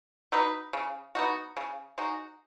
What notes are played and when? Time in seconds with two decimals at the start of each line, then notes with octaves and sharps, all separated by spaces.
0.32 F#3 D#4 B4
0.73 C#3
1.15 B3 D#4 F#4
1.57 C#3
1.98 G#3 D#4 F#4